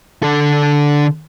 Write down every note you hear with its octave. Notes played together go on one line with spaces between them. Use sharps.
D3 A4